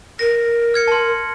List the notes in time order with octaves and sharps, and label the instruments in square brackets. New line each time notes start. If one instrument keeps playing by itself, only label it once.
[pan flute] A#4 [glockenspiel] A#6
[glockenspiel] F6 G#6 C#7
A5 C6